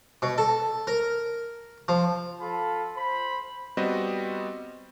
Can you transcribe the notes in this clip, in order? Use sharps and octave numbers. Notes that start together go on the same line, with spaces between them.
B2
A4
A#4
F3
F4 A4 A5 B5
C5 B5
G3 B3 C4 F#4 D#5